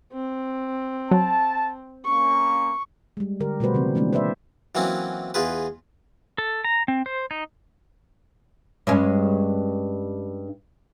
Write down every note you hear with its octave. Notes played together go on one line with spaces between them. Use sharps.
C4
F#3 A5
A#3 C#4 C#6
G3 G#3
D3 G4 A#4
B2 G3 A3 F#4 B4 C5
C#3 E3 C4
E3 F3 G#3 A#3 C4 D4
B4 C5 D5 E5
E3 F#3 A#3 C4 C#4
E2 F4 G#4 B4
A4
A#5
C4
C5
D#4
G2 G#3 C#4